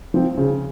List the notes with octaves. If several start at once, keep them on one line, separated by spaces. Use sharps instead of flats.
F3 C4 F4
C#3